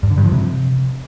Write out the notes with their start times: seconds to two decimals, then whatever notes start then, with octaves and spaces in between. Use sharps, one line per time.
0.03 G2
0.10 D3
0.18 G2
0.25 F3
0.32 C3